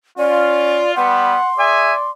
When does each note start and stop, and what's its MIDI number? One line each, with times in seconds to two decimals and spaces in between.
0.18 0.83 61
0.18 0.96 65
0.18 0.92 74
0.96 1.37 55
0.96 1.37 59
0.96 1.51 78
0.96 2.11 84
1.58 1.92 68
1.58 2.10 74
1.58 1.92 76
1.58 1.92 80